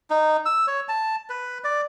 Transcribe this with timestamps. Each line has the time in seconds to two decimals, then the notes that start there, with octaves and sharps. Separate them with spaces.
0.10 D#4
0.46 E6
0.67 C#5
0.88 A5
1.30 B4
1.64 D5